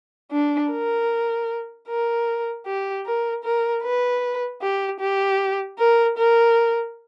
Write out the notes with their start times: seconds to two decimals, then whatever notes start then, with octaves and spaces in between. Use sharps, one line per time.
0.32 D4
0.71 A#4
1.88 A#4
2.66 G4
3.05 A#4
3.44 A#4
3.83 B4
4.62 G4
5.00 G4
5.79 A#4
6.18 A#4